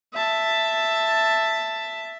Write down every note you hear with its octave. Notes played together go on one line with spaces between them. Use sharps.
E5 A5